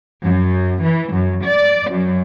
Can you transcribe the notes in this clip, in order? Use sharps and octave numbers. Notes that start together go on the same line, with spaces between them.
F#2
E3
F#2
D5
F#2